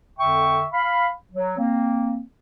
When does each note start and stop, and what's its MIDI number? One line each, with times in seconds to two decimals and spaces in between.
0.18 0.66 41
0.18 0.66 50
0.18 0.66 76
0.18 0.66 79
0.18 0.66 85
0.72 1.09 77
0.72 1.09 83
1.32 1.55 54
1.58 2.21 58
1.58 2.21 60